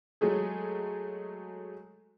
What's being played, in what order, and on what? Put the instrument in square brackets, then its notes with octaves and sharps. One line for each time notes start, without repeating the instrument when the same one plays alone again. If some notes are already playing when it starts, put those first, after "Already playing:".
[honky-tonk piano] F#3 G#3 A3 G#4